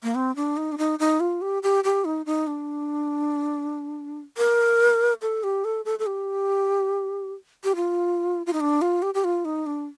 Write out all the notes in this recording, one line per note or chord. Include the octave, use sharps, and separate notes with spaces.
A#3
C4
D4
D#4
D4
D#4
D#4
F4
G4
G4
G4
D#4
D#4
D4
A#4
A4
G4
A4
A4
A4
G4
G4
F4
F4
D#4
D4
F4
G4
G4
F4
D#4
D4